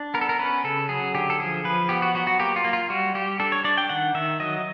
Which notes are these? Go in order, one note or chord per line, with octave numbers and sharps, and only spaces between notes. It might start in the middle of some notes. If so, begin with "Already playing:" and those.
Already playing: D4
B3 A#4
A4
A#4
C#4 B4
C#3 A4
F#3 G#4
D3 G4
A4
F3 G#4
F3 B4
B3 G4
F#4
F#3 F#4
F#4
A#3 G4
F4
A#3
F4
G3 F#4
G3 G4
D4 A4
C#5
D4 D5
G5
D#3 F#5
D#3 E5
F#3 D#5